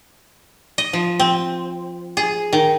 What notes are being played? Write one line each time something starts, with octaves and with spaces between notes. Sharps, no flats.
D#5
F3
C4
G#4
D#3